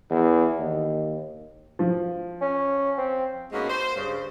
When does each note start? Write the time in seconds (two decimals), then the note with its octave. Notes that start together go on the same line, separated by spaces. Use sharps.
0.10 E2
0.59 D#2
1.79 F3
2.41 C#4
2.97 C4
3.52 G#2 G#3 A#3 B3 C#4 F#4
3.69 C5
3.96 G2 C#3 C5